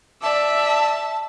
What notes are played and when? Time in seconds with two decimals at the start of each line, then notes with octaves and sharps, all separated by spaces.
0.22 D5 E5 A5